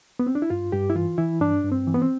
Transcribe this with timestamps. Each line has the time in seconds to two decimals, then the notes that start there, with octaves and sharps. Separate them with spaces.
0.19 B3
0.27 C4
0.35 D4
0.42 E4
0.50 G2 F4
0.72 G2 G4
0.90 E4
0.96 E3 F4
1.18 E3 E4
1.41 G2 D4
1.64 G2
1.72 C4
1.87 E3
1.94 B3
2.02 C4